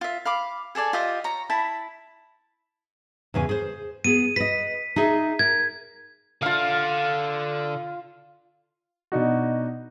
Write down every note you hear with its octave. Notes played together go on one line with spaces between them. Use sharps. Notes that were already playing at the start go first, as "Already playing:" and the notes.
F4 E5
F5 B5 D6
G#4 A4 D5 G#5
F4 G4 D#5 E5
C#5 A#5
E4 A5 B5
E2 C#3 G#5
G#4 C5
B3 G#4 D#7
B4 D#5 B6
D#4 G#4 E5
A#4 G#6
D3 F4 F5
B2 D4 D#4 F#4